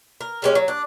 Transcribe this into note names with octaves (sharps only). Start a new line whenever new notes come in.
A#4
G3 G#3 C#4
F#3
D4